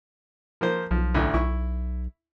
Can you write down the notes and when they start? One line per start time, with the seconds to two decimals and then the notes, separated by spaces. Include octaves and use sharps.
0.61 F3 A#3 C5
0.91 B1 F3
1.15 A1 D2
1.34 B1 E4 C#6